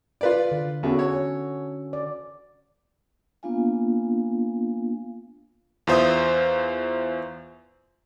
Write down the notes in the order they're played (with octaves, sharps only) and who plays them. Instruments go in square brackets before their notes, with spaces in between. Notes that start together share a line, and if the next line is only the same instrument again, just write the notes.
[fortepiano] F4 B4 D5
[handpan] D3
[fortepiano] E2 [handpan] C#4 F#4 A4
[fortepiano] C#5
[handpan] D5
[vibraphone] A#3 B3 D4 F4 F5 G#5
[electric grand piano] E2 F4 C5 E5 D#6